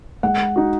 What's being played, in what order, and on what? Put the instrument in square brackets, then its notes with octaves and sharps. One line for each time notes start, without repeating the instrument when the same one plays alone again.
[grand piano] G#3 [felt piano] F#5
[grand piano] D#4 F#4